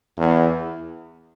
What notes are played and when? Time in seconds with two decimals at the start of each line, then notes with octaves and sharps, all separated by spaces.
0.17 E2